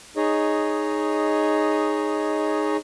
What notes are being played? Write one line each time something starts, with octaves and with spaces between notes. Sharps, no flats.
D#4 G#4 C#5 D#5